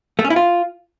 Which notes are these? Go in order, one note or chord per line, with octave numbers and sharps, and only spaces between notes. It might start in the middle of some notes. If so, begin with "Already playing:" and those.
A3
C#4
E4
F4